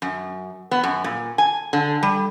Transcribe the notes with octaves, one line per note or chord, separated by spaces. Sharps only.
F#2
B3
F#2
A#2
G#5
D3
G3